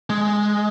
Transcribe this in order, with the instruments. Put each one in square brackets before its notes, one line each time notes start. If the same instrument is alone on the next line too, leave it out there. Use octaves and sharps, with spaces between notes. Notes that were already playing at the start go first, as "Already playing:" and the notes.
[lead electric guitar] G#3